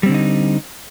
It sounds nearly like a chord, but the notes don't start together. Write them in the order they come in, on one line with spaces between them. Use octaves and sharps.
G3 C4 D3 D4 D#4